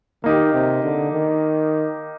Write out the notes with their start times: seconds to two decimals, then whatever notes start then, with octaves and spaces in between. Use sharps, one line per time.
0.24 D#3 A#3 D#4 G4
0.53 C3
0.83 D3
1.12 D#3